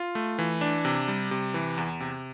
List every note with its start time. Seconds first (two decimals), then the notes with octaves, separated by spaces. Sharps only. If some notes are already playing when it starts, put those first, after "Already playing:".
Already playing: F4
0.15 A3
0.39 E3
0.61 D4
0.85 C3
1.08 G3
1.31 C3
1.54 E3
1.78 E2
2.00 C3